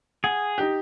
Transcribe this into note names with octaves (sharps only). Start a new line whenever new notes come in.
G#4 F#5
D#4 G4